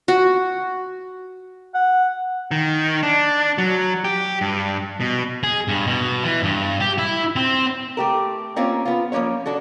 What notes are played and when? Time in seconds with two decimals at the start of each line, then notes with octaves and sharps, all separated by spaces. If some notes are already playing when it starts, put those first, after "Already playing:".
0.08 F#4
1.74 F#5
2.51 D#3
3.03 D4
3.58 F#3
4.04 G4
4.41 G2
5.01 B2
5.43 G#4
5.68 G2
5.86 B2
6.24 E3
6.43 G2
6.81 G4
6.98 E4
7.36 C4
7.97 A3 G4 A#4
8.56 A#3 C4 C#4 F4 A#4
8.85 B3 F4
9.12 F3 F#3 A#3 C#4 C#5
9.46 D4 F#4 A4